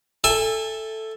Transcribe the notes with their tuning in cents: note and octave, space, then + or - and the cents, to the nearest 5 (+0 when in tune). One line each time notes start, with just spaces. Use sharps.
A4 +0 E5 +0 G#5 -30